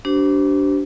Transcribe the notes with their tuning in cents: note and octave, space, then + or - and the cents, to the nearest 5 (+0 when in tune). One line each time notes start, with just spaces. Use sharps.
D4 -20 G4 -40 C5 -20